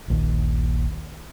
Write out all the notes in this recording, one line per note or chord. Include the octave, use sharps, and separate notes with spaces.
D#1 A#1 D#2